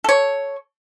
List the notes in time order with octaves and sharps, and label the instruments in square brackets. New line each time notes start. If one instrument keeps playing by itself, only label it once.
[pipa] A4 C#5